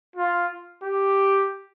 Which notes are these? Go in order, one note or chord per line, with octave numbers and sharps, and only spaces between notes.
F4
G4